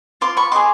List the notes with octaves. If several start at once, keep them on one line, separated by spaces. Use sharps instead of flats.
F4 C6 D6
B5 C#6
G#4 C5 D#5 C6 D6